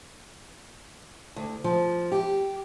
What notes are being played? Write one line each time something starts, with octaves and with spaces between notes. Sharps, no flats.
D2
F3
G4